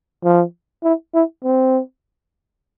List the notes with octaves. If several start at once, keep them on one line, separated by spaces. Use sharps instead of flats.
F3
E4
E4
C4